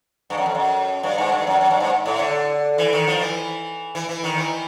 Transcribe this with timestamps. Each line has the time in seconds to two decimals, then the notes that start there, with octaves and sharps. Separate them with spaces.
0.30 G2
0.37 F#2
0.46 F2
0.55 F#2
1.03 G2
1.18 G#2
1.32 G2
1.47 F#2
1.61 F#2
1.70 G2
1.80 G#2
2.06 A2
2.19 D3
2.78 E3
2.93 D#3
3.07 F3
3.21 E3
3.95 E3
4.09 E3
4.24 D#3
4.38 E3